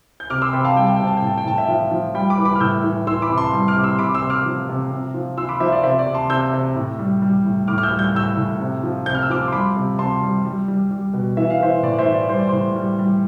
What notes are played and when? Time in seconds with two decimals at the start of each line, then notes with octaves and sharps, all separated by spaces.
0.20 G6
0.30 C3 D6 F6
0.42 C6 E6
0.53 C3 G5 B5
0.65 F5 A5
0.76 G3 G5
0.86 A5
0.96 C3 G5
1.07 A5
1.17 G5
1.22 A2 A5
1.38 G5
1.45 A2 A5
1.58 E5 G5
1.68 F3
1.91 F3
2.14 G3 G5 B5
2.30 B5 D6
2.38 E3
2.45 B5 D6
2.55 F6
2.61 A2 E6 G6
2.84 E3
3.07 E3 C6 E6
3.22 B5 D6
3.30 C3
3.37 A5 C6
3.53 G3
3.68 D6 F6
3.76 C3
3.84 C6 E6
3.99 C3 B5 D6
4.14 C6 E6
4.22 C3
4.30 D6 F6
4.45 F3
4.69 C3
4.91 C3
5.14 F3
5.37 F3 C6 E6
5.49 B5 D6
5.60 F3 C5 E5
5.72 D5
5.83 C3 C5 E5
5.99 D5
6.07 C3
6.14 A5 C6
6.29 C3 E6 G6
6.53 C3
6.76 A2
6.99 G3
7.22 G3
7.45 A2
7.68 A2 D6 F6
7.78 F6
7.83 E6 G6
7.91 G3
7.99 G6
8.14 A2 E6 G6
8.37 A2
8.60 C3
8.83 F3
9.06 C3 G6
9.15 F6
9.23 E6
9.30 F3 D6 F6
9.48 C6
9.52 G3 B5 D6
9.76 C3
9.99 C3 A5 C6
10.21 G3
10.45 G3
10.68 G3
10.91 G3
11.13 B2
11.37 E3 E5
11.50 F5
11.60 E3 C5 E5
11.83 A2 D5
11.99 C5 E5
12.06 E3
12.14 D5
12.29 G3 C5
12.39 D5
12.49 A2 C5
12.76 G3
12.99 G3